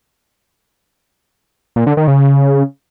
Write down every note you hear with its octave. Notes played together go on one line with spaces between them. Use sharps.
A#2
D3
D#3
C#3